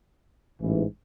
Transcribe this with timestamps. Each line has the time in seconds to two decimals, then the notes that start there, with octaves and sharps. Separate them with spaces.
0.59 A1 G#2 E3